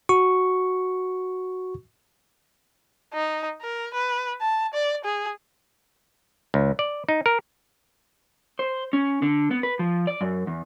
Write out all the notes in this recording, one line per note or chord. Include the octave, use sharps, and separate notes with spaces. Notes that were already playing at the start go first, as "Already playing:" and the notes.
F#4 C#6
D#4
A#4
B4
A5
D5
G#4
C#2
D5
D#4
A#4
C5
C#4
D3
B3
B4
F3
D5
F#2
E2